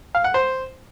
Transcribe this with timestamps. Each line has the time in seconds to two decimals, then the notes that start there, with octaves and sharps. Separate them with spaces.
0.15 F5
0.24 F#5
0.34 C5